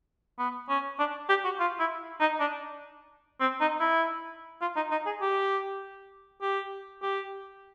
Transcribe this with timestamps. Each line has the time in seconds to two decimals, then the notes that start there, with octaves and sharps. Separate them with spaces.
0.39 B3
0.69 C#4
0.99 D4
1.29 G4
1.44 F#4
1.60 F4
1.80 E4
2.20 D#4
2.40 D4
3.40 C4
3.61 D#4
3.80 E4
4.61 F4
4.76 D#4
4.91 D#4
5.06 G#4
5.21 G4
6.42 G4
7.02 G4